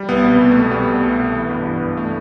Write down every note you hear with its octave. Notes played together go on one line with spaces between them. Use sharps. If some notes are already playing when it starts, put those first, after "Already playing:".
Already playing: G3
C2 B3
B2
B3
C2
B3
B2 A3
G3 B3
B2
C2
B2
E3
G2
E3
G2
A3